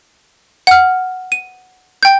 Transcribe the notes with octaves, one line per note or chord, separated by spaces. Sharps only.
F#5 F6
D#7
G5 G6